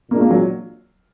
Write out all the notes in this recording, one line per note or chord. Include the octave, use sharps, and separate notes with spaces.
A#2 G#3 A#3 D4 F4
A#3
F#3